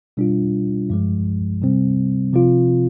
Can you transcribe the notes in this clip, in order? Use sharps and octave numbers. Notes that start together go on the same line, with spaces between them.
B2 G3 D4 F4
G2 F3 G#3
C3 G3 C4
C3 F3 C4 F4